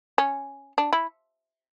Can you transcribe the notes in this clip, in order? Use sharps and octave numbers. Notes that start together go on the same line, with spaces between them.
C#4
D4
E4